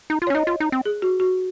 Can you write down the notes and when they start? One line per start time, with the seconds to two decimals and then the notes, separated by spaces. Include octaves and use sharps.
0.10 D#4
0.22 F4
0.27 C#5
0.30 C#4
0.35 D#4 D#5
0.47 F4
0.60 D#4
0.72 C4
0.85 G#4
1.02 F#4
1.20 F#4